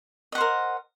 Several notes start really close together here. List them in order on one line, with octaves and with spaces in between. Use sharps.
D#5 F#5 C5 A#4